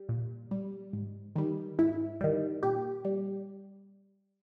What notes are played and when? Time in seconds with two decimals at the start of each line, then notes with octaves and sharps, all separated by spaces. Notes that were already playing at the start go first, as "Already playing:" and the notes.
Already playing: G3
0.09 A#2
0.51 G3
0.93 G#2
1.36 D#3 G3
1.79 G#2 E4
2.21 D#3 G3
2.63 A#2 G4
3.05 G3